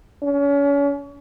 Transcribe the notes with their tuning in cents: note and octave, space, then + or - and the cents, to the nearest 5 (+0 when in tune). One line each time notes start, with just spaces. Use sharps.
C#4 +35